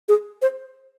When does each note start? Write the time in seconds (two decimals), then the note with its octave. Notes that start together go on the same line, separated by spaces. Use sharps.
0.09 G#4
0.42 C5